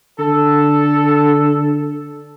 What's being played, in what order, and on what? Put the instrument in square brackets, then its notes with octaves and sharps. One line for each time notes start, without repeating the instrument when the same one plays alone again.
[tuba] D3 [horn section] A4